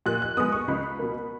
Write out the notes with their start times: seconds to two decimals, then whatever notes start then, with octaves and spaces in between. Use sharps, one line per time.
0.06 A#2 F#6
0.22 F#6
0.37 G#3 B3 D#6
0.52 C#6
0.68 C#2 B5
0.99 B2 A#3